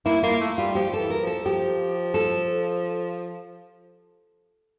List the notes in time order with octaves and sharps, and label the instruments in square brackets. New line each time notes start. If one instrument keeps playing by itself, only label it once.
[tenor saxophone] A#3 [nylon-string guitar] E4
[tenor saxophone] A#3 [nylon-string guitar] F4
[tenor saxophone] A3
[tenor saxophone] G3 [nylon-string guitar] F4
[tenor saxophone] F3 [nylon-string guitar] G4
[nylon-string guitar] A4
[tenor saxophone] E3
[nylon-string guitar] A#4
[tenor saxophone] F3
[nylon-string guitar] A4
[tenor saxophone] F3 [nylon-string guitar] G4
[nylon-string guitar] A4